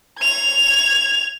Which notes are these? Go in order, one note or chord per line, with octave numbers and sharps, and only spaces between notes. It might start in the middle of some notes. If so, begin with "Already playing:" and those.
G#6 F7